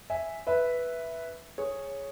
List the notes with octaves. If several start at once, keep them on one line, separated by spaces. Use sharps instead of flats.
E5 G#5
B4 E5
G#4 C#5